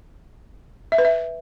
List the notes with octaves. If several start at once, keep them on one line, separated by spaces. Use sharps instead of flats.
E5
B4
E5